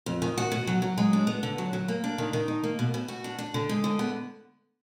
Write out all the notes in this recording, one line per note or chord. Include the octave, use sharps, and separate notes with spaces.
F2
D#3
F#4
B2
F#3
F#3
G#3
D4
B3
D3
F#3
F#3
A#3
D4
D#3
D#3
D#4
A#3
B2
B2
F#4
D4
D4
D3
G#3
D3
B3